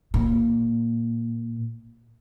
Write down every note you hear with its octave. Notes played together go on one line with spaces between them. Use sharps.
A#2